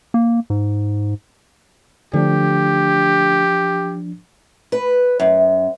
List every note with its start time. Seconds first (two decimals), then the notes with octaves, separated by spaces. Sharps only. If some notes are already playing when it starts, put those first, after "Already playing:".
0.14 A#3
0.50 G#2
2.13 D3 F3 A3 D4 G4
4.72 B4
5.20 F#2